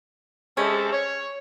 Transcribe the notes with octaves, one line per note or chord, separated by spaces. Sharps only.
C3 G#3 C#4 A4
C#5